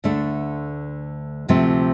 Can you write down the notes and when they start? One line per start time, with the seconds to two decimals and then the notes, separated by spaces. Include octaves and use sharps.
0.04 D2 D3 A3 D4
1.48 D2 C3 F3 A3 C4